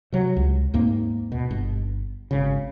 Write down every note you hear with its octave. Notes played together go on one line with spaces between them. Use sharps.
C3 F#3
C#2
D#2 G#2 A#3 C4
B2
G1
G#1 C#3